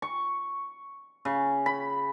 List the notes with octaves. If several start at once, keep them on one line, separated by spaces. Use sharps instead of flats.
C#6
C#3
B5